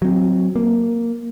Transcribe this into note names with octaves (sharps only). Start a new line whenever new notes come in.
F#3 C4
A#3